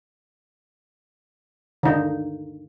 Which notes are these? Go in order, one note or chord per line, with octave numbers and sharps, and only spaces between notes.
D3 D#4